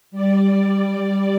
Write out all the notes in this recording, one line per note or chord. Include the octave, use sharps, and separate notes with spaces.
G3 D5